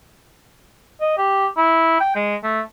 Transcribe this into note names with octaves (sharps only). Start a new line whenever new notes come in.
D#5
G4
E4
G5
G#3
A3